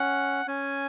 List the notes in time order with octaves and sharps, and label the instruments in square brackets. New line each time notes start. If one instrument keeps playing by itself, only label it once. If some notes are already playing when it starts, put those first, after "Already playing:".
Already playing: [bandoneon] C#4 [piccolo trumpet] F#5
[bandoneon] C#4 [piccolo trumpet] G#5